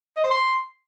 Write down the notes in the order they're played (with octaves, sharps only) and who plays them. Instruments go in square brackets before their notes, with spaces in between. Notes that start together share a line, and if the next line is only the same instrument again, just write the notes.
[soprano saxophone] D#5
C5
C6